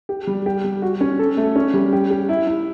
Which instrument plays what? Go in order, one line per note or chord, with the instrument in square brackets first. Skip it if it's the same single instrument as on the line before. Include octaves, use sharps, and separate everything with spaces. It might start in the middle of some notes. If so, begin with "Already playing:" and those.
[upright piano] G4
G3
G4
G3
F#4
C#4
A4
A3
C#4
G3
G4
G4
E4
E4